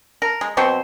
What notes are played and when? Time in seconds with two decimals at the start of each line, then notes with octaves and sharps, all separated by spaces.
0.22 A#4
0.41 G#3
0.57 B2 F#3 C4 C5